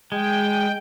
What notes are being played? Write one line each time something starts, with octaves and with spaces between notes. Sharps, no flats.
G#3 G5